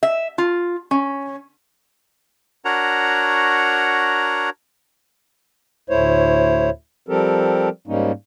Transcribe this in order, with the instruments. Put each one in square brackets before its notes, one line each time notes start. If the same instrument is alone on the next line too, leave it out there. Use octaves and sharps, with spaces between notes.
[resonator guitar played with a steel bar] E5
F4
C#4
[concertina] D4 F#4 A#4 C#5 F#5 A#5
[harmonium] D2 A2 A3 E4 C5 C#5
F3 G3 C4 G4 A4 A#4
G#2 G3 A#3 C#4 D#4